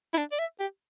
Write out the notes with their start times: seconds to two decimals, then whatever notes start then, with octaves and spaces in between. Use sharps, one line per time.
0.14 E4
0.17 D4
0.32 D5
0.39 E5
0.60 G4